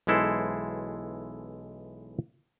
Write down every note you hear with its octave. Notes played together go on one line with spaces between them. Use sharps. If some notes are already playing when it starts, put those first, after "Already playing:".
B1 E3 G#3 E4 A4 C5